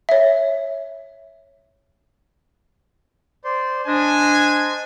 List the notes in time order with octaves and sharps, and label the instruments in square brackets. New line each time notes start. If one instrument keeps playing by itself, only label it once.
[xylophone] C#5 E5
[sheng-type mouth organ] C5 D5 C6
[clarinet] D4 [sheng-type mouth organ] C5 D#5 [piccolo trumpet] G#5